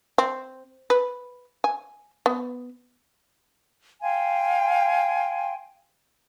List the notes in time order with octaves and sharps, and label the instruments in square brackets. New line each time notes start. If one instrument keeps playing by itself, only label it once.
[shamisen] C4
B4
G#5
B3
[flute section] F5 G5 G#5 C6